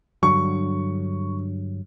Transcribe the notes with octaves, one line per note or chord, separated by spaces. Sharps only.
G2 D3 F#3 C#6